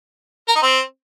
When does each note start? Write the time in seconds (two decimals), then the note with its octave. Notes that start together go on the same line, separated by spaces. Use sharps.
0.48 A#4
0.55 D#4
0.62 C4